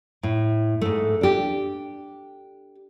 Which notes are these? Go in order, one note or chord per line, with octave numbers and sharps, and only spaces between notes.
A2
G#2 A3
D4 G4